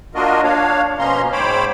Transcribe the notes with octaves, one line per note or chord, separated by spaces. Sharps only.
A#3 D4 F4 F#4 A#4 D#5
D4 C#5 F5
B2 F3 A#3 C#4 A#5 C6
G#2 C5 C#5 G5 B5 D6